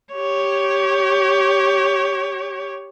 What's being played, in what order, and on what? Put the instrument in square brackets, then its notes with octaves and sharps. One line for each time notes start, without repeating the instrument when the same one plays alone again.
[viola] G4 C#5